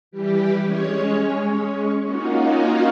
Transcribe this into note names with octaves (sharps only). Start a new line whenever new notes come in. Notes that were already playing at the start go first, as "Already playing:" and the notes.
E3 G3 G4
G#3 C#4 C#5
A#3 C#4 D#4 F4 F#4